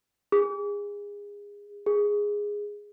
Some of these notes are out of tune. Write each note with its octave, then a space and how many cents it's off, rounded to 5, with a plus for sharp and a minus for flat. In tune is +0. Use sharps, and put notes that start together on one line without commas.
G#4 -25
G#4 -10